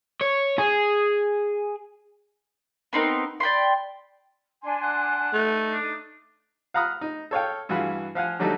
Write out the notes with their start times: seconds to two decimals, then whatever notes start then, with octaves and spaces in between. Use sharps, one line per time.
0.21 C#5
0.58 G#4
2.93 B3 C4 D#4 A#4
3.40 D5 G5 B5 C6
4.63 D4 G#5 C6
4.83 F#5
5.34 A3 D#4
5.72 D4
6.74 F5 F#5 A#5 B5 D#6 F6
7.01 D#4
7.31 A4 C#5 F5 G5
7.69 G2 E3 F4 F#4 G#4 B5
8.15 F3 F5 F#5 G#5
8.40 D3 F#3 G3 A3 D#4 A4